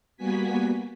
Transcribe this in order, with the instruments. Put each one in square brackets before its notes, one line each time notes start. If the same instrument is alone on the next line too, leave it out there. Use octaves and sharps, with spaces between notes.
[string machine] G3 A#3 B3 F#4 G#5 B6